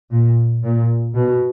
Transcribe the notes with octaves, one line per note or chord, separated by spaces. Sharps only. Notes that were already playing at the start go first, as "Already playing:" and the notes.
A#2
A#2
B2